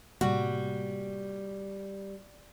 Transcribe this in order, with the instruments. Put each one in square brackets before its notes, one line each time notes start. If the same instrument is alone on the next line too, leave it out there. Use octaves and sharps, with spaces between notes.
[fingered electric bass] A2 C3 A#3 [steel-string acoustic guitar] G3 [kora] F#4